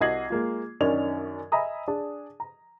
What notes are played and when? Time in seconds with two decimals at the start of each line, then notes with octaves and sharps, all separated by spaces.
0.01 C2 F#4 D#5 G#6 C7 F#7
0.30 G#3 A#3 F4
0.80 F#2 D#3 C#4 D4 G#6 F7
1.52 D#5 E5 G#5 A#5 B5 D#6
1.88 D4 G#4 A5
2.40 A#5